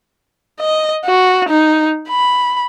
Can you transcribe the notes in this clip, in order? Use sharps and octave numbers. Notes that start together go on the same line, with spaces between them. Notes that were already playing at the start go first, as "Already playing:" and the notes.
D#5
F#4
D#4
B5